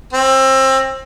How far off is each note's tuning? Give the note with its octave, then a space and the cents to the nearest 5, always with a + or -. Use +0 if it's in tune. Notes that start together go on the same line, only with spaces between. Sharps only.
C4 +25